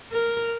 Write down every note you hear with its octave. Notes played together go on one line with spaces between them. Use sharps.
A#4